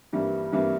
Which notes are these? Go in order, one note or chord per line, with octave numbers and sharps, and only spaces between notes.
G2 E3 G3 A#3
G2 E3 G3 A#3